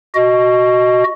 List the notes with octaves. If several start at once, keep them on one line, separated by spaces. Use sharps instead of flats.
F#4 D#5